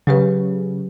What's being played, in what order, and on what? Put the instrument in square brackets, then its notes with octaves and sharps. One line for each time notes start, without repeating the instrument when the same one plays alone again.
[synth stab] C#3 [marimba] F#3 G4 B4